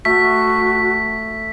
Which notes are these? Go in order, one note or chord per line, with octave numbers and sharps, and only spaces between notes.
A3 F#4 B6